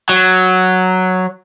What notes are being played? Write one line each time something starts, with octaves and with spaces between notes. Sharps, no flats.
F#3